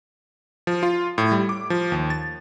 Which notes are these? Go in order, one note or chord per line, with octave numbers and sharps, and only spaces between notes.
F3
F4
A2
G3
D6
F3
D#2
A6